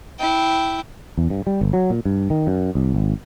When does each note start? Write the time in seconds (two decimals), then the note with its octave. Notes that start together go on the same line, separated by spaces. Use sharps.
0.19 E4 G5
1.17 E2
1.30 G2
1.47 G3
1.61 G1
1.73 F#3
1.90 A#2
2.05 G2
2.30 D#3
2.47 F#2
2.75 C2
2.94 G#1